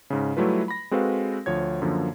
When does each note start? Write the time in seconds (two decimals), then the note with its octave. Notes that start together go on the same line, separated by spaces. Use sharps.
0.10 G#2 C#3
0.37 F#3 G3 A3 E4 F4 B4
0.68 B5 A#6
0.91 G#3 C4 F#4 A4 B4 F5
1.46 D2 F3 C#5 G#6
1.82 F#2 D3 F3 A#3